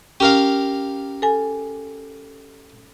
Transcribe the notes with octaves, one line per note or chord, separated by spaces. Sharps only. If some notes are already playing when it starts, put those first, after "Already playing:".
C#4 G4 A#4 F5
A4 G#5